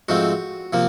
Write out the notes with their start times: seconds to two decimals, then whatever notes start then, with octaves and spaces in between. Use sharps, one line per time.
0.09 G#2 F3 A3 C4 F#4
0.73 C3 F3 A#3